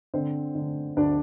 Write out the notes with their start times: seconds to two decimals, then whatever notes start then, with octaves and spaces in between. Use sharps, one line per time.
0.14 D3 C4 C5
0.55 D3
0.97 D2 D4 D5